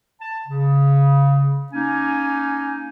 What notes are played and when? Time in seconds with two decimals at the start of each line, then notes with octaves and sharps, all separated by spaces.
0.20 A5
0.47 C#3
1.73 A#3 C#4 D#4 G#5